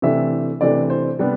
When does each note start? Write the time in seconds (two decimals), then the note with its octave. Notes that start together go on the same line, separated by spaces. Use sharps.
0.02 C3 E3 A3 D4 E5
0.61 C3 E3 A3 D4 D5
0.90 C5
1.19 C3 G3 B3 D4